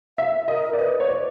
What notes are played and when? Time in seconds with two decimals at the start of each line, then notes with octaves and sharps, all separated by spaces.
0.18 E5 F5
0.33 E5
0.48 A#4 D#5
0.73 D5
0.78 B4 D#5
1.00 C#5
1.09 C5 D5